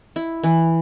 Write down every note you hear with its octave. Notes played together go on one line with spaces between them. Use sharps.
E4
E3